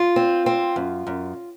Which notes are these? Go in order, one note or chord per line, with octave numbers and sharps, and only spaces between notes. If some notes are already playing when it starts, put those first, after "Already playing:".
Already playing: F4
C4
C4
F#2
F#2